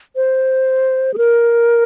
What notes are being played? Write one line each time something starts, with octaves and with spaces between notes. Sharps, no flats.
C5
G#4
A#4